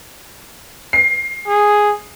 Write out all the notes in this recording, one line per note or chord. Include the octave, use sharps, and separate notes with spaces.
C7
G#4